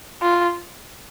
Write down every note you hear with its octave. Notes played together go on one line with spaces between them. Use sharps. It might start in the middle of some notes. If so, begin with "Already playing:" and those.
F4